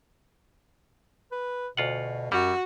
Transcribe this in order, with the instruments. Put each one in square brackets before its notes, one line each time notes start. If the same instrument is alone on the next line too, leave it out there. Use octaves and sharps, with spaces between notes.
[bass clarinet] B4
[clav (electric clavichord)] D2 F4 F#5 [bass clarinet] B2
[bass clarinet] F#2 [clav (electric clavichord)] G3 [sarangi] F#4